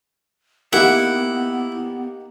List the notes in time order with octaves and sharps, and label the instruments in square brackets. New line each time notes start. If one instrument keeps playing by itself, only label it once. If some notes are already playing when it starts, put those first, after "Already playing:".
[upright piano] A#3 D#4 G4 [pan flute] B3 [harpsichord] E4 [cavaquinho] F#5